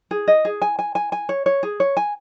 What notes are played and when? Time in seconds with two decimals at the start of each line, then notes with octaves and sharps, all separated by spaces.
0.11 G#4
0.28 D#5
0.45 G#4
0.62 G#5
0.79 G#5
0.95 G#5
1.12 G#5
1.29 C#5
1.46 C#5
1.63 G#4
1.80 C#5
1.97 G#5